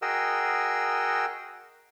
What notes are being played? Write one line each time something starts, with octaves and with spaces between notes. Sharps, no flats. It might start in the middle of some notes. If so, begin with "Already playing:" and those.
F#4 G#4 A#4 D#5 G5 E6